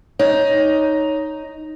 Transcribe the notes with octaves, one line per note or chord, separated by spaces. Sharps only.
D#4 C#5